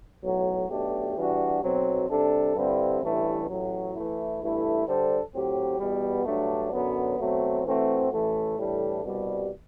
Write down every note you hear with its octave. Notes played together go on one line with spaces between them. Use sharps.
B1 A2 F#3
B1 B2 A3 D4 G4
E3 G3 D4 F#4
B1 B2 F#3 C4
C3 G3 D4 A4
G2 D3 G3 C4 E4
A1 G2 E3 A3 E4
A1 A2 F#3
E3 A3 E4
G2 E3 A3 E4 A4
D3 G3 D4 A4 C5
A2 F#3 C4 G4
E2 B2 G3 B3
G2 F#3 A3 D4
F#2 D3 F#3 B3
B2 F#3 A3 C4
E3 A3 C4 F#4
A1 A2 E3 A3
A2 E3 G3 D4 A4
C2 B2 G3